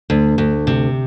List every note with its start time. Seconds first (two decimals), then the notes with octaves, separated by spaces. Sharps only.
0.10 D2
0.38 D2
0.67 C3